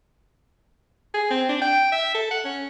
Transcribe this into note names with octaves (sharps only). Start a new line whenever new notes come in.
G#4
C4
D4
G5
E5
A4
F#5
C#4